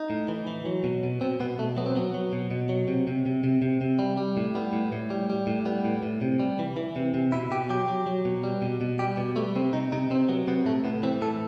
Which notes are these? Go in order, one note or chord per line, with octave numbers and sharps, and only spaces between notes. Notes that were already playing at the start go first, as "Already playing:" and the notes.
Already playing: D#4
A2
E3
E3
F#3
B2
B2
B2 C4
B2 B3
B2 A3
F#3 B3
C4
F#3 B3
F#3
B2
B2
F#3
C3
C3
C3
C3
C3
C3
G3
G3
A2
G3 B3
A2
A2
G3
G3
A2
G3 B3
A2
A2
C3
G3
E3
E3
C3
C3
B2 E4
B2 G4
F#3 G4
F#3
F#3
B2
G3
B2
B2
G3 G4
B2
G3 A3
C3 C4
C3 D#4
C3 D#4
C3 C4
F#3 B3
C3 B3
A2 A3
A2 B3
E3 C4
A2 A4